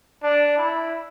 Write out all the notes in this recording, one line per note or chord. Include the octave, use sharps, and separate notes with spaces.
D4
E4